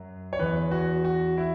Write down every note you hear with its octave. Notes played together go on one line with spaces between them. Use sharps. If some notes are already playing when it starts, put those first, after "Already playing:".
Already playing: F#2 F#3
C#5
E2 E3 B4
F#4
F#4
E4